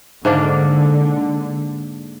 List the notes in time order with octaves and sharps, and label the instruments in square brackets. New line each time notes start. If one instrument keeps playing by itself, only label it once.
[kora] G#2 A#3 D4 [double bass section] D3